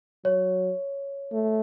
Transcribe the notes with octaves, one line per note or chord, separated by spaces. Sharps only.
F#3 C#5
A3